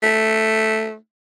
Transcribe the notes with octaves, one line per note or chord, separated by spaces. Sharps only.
A3